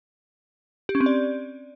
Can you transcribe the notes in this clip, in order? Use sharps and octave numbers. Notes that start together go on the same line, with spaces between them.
G4
C#4
C4
D5